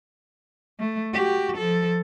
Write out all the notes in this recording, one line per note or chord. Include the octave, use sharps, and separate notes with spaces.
A3
F#4 G4
F3 A4